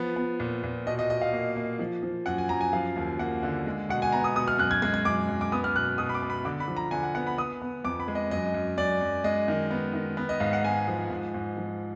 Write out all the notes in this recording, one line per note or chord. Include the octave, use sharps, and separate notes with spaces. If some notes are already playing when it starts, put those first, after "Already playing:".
Already playing: F3 B3
B3
A#2
A#2
B2 D#5
D#5
B2 D#5
F5
A#3
A#3
F3
F3
F#2 F#5
G#5
F#2 A#5
G#5
F3 F5
D#2
A#3 F#5
D3
G#3
B2 F#5
G#5
B3 A#5
D#6
B2 D#6
F6
F#2 F#6
G#6
G#3 G#6
G#6
F#2 D6
F#2
D6
B3 D#6
F6
B2 F#6
B2 D#6
B5
D6
B3
B5
D3 D6
B5
F3
A#5
D3 G#5
F#5
B3 F#5
B5
B3 D#6
B3
F2 D6
B5
G#3
D#5
F#2 D#5
F#2
F#2 D5
F#2
G#3 D#5
D#3
B3
D#3
B3
D#5
G#2 F5
F#5
G#3 G#5
F3
G#2
G#2
F3